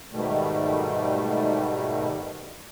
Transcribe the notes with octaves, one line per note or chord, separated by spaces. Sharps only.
G#2 B2 D#3 G3 A3